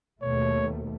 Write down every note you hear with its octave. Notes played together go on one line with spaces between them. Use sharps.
D#2 B2 A3 C#5